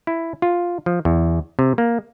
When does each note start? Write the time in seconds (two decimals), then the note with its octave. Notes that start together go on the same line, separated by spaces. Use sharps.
0.07 E4
0.42 F4
0.86 F3
1.05 E2
1.59 C3
1.78 A#3